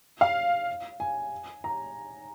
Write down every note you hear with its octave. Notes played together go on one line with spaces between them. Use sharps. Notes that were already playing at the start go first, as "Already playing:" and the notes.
F5
G#5
A#5